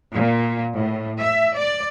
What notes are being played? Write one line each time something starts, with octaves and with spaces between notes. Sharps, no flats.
A#2
A2
E5
D5